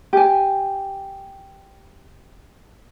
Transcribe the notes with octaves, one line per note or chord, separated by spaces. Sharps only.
G4 G#5